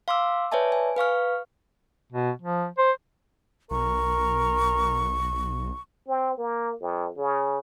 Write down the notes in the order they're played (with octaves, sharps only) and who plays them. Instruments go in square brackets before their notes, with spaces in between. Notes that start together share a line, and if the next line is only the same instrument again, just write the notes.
[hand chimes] F5 C6 D6 E6
B4 C#5 D5 E5 G#5 A5
G#5
B4 F5 C#6 F6
[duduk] B2
F3
C5
[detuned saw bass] B1 [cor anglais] A#4 [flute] C#6
[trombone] C4
A#3
F2
C#3